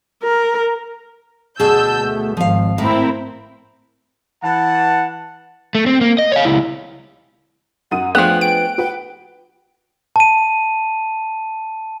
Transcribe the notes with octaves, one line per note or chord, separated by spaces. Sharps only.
A#4
D2 B2 G#4 A5 E6 G6
A3
G#1 F3 F5
A2 C4 E4 A#4
E3 F#5 A5
A3
C4
A#3
D#5
C#5 F5
C#2 E4
F#2 F#5 D#6 D#7
F3 A3 B3 D4 G#4 G5 F#6
G5 D7
G4 B4 F#5 G5
A5 D#7